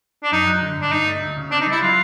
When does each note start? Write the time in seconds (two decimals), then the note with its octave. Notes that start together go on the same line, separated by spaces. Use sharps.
0.23 D4
0.32 F#2 D#4
0.47 F#3
0.62 D3
0.77 G2 D4
0.92 G2 D#4
1.07 A3
1.21 D2
1.37 C#3
1.51 C4 D4
1.61 D#4
1.67 G3 E4
1.81 F#3 F4